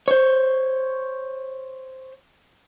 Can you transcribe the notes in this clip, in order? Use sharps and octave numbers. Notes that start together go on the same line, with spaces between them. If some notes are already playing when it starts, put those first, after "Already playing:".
C5 C#5